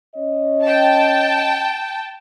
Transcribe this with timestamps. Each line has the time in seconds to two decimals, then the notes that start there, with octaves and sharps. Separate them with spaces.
0.16 C#4 C#5 D#5
0.64 G5 A5